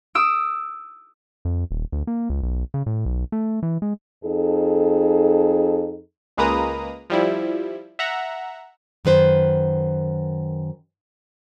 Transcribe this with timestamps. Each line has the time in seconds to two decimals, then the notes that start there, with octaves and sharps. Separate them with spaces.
0.15 D#6 E6 D7
1.45 F2
1.71 D#1
1.92 D2
2.07 A#3
2.30 C#2
2.43 B1
2.74 C#3
2.86 A2
3.06 B1
3.32 A3
3.63 E3
3.82 G#3
4.25 F2 D#4 G#4 A4
6.37 C#2 G#3 A#3 B4 A#5 D#6
7.10 F3 G3 E4
7.99 E5 F#5 A#5
9.05 F#2 D#3 B4 C5